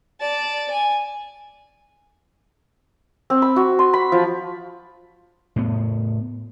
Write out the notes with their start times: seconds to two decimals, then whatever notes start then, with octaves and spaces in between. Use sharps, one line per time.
0.21 D5 A5
0.71 G#5
3.30 C4
3.42 B5
3.56 F#4
3.79 C6
3.94 B5
4.12 F3
5.56 A2 B3